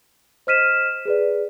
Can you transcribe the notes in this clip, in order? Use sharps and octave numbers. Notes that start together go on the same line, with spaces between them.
C5 D#5 F6 B6 D#7 E7
G#4 B4 D5